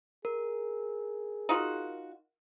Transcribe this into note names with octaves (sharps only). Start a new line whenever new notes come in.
G#4 A#4
D#4 F4 F#4